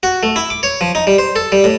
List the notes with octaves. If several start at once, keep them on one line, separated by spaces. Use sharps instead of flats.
F#4
A3
E4
D6
C#5
F3
D#4
G3
C5
A4
G3
A2